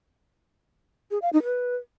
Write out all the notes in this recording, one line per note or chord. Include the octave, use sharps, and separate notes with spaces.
G#4
F5
D#4
B4